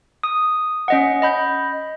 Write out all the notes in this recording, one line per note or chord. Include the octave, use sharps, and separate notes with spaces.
D#6
C#4 D#5 F#5
D#5 B5 G6